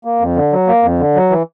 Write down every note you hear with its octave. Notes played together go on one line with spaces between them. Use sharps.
A#3
F2
D3
F#3
A#3
F2
D3
F#3
E3